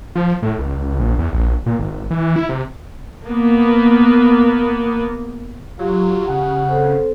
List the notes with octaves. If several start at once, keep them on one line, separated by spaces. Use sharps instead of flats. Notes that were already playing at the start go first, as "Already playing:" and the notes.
F3
A2
C#2
A#1
E2
A#1
A#2
G#1
E3
E4
C3
A#3 B3
F#3 F4 G4
C#3 F#5
C4 A4 C5